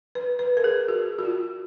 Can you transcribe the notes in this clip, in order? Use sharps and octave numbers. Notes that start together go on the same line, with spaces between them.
B4
B4
A#4
G#4
F#4
F#4
F4